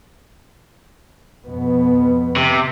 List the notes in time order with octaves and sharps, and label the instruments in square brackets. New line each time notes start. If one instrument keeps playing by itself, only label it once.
[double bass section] F2 B2 B3
[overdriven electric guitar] C3